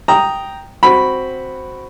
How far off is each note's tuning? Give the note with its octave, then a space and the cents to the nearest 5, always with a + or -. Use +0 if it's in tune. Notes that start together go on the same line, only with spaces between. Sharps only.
G5 +0 A#5 +0 D#6 +0
C4 +0 F#4 +0 B5 +0